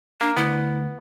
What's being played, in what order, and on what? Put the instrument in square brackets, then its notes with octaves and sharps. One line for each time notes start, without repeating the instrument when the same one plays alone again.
[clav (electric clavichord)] A#3 [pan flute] D4
[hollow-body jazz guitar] D2 [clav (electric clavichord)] B3 [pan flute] E4